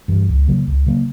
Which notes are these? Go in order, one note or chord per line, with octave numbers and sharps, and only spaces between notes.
G2 E3
C#2
C#3 F#3 A#3
C#2
C#3 F#3 A#3